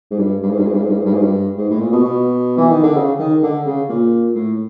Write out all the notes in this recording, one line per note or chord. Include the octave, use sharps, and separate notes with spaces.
G#2
G2
G2
G#2
G2
G#2
G2
G#2
G2
G#2
G2
G#2
G2
G#2
A2
A#2
B2
B2
E3
D#3
D3
C#3
D#3
D3
C#3
A#2
A2